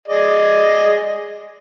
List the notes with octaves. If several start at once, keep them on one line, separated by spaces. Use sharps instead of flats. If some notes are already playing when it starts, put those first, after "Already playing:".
G#4 D5 D#5